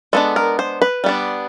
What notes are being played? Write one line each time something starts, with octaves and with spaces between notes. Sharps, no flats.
G#3 B3 D4 A4
A#4
C5
B4
G3 B3 D4